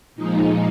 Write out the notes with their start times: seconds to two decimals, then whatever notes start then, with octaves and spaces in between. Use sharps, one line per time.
0.15 A#2 F3 G#3 D#4